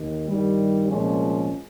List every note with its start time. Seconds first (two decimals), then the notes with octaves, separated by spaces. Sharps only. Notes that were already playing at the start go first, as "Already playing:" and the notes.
Already playing: D#2 D#3
0.28 G2 D#3 G3
0.88 C2 A#2 F3 G#3 C#4